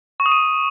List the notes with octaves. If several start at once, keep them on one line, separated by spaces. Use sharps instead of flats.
C#6
D#6
D#7